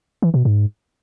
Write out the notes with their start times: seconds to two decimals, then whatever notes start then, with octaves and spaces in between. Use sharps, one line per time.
0.22 E3
0.34 B2
0.45 G#2